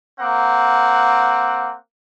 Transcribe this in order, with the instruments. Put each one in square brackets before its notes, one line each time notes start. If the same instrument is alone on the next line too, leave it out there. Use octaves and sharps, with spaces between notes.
[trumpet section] A#3 C4 F#5